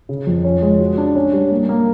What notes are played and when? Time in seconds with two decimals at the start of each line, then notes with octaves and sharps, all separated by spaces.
0.09 C#3
0.27 F2
0.44 C#4
0.62 G#3
0.80 F#4
0.98 D4
1.15 C#4
1.33 G3
1.51 A#3
1.69 A#3